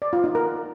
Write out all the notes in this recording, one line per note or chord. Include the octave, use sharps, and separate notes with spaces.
D5
F4
D#4
A#4